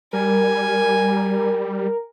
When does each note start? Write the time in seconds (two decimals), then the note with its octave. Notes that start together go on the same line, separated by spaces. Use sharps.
0.13 G3 A#4 G#5